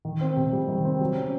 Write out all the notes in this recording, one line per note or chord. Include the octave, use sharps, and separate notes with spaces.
D#3
C4
C3
G3
D#3
C4
F#3
C#4